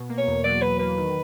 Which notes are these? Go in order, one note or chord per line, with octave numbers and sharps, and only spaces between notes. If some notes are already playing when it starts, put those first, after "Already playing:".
Already playing: B2
A#3
C#5
E2
F#3 D5
B2 B4
A#3 B4
D#3